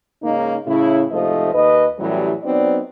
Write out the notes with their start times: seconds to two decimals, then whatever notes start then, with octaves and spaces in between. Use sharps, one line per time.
0.22 G#2 C#3 A#3 D#4
0.66 A2 C#3 E4
1.11 G#2 C3 F3 A3 C5 D#5
1.53 D#2 B4 D#5
1.98 F#2 A2 E3 F#3 G3
2.43 F#3 B3 C4 D#4 D5